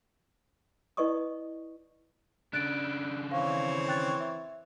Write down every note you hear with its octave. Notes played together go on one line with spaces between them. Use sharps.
E4 B4 D5 D#5 C#6 D#6
C#3 D4 F#6 A6 D7
E3 C4 C#5 F5
G5 F#6 A6
E5